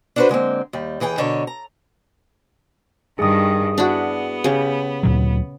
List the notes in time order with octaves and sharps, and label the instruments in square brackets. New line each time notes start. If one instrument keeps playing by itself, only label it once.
[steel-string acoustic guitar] D4 E4 F#4 A4 B4 C5
D3 G#3 A#3 C4
D#2 G3
D#2 E3 G#4 A#4 G5
B2 D3 A#4 C#5
A#5
[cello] G2 D#3 [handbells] G#4 D#6
[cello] B3 [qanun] D4 E4 F#4
[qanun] C#3 G4
[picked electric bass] D2 A#2 F#3